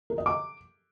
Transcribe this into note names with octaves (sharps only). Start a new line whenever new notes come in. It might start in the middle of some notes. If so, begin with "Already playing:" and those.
A#4
D#5
D6